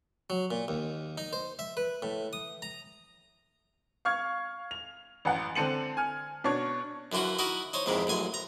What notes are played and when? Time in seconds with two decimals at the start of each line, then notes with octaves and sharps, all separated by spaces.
0.30 F#3
0.51 A#2
0.68 D#2
1.18 D#4
1.33 C5
1.59 E5
1.77 B4
2.02 A2
2.33 D#6
2.62 A#5
4.05 F5 C#6 F6 G#6
4.71 F7
5.25 A1 F#2 F#5
5.55 D3 C4 A5 C#7 D#7 F#7
5.97 G#5 F6
6.44 B2 D4 C#5 C#6
7.12 F#2 D3 E3 F4 F#4
7.39 D#4 E4 F#4 A#4 D#5
7.73 D#4 C5 C#5
7.86 F2 G#2 C3 D#3 E3
8.07 A1 F#2 G#5 C6
8.34 A#5